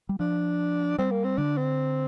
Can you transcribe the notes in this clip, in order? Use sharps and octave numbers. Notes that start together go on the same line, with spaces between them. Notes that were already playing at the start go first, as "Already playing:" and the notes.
G3
F3 D4
G3 C4
A#3
C4
D3 D4
C4